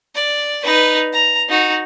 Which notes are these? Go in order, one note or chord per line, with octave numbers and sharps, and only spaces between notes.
D5
D#4 B4
A#5
D#4 F#4